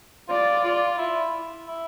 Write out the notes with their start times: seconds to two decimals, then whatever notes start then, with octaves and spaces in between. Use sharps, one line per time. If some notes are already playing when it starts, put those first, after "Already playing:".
0.29 F4 D5
0.64 F4
0.98 E4
1.68 E4